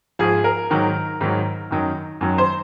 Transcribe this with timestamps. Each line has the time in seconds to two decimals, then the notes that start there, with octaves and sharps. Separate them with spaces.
0.19 G#2 F3 G#4
0.44 A#4
0.70 G#2 D#3 F#3
1.21 G#2 D#3 F#3
1.71 F#2 D#3 F#3
2.21 F#2 D#3 F#3
2.38 C5